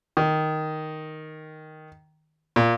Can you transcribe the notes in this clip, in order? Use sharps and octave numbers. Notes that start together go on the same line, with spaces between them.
D#3
A#2